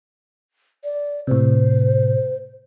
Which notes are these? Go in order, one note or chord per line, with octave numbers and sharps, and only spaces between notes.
D5
A2 C3 C5